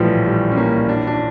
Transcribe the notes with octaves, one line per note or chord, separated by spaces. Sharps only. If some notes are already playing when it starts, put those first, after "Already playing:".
Already playing: A#1 A2 E3 F3 G3
G3
C#4
A#3
D4
D4